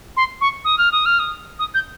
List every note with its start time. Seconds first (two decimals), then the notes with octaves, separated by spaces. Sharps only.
0.16 C6
0.41 C#6
0.64 D#6
0.78 F6
0.92 D#6
1.05 F6
1.19 D#6
1.59 D#6
1.74 G6